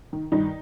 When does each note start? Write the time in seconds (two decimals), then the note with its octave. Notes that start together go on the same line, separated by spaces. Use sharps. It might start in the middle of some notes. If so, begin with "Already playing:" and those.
0.13 D#3
0.32 G2 D#3 D#4